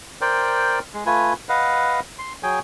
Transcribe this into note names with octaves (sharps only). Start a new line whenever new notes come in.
A#4 C5 D5 G5
G#3
A3 F4 B4 G#5
B4 D#5 F5 F#5
C6
F#3 G#4 G5 G#5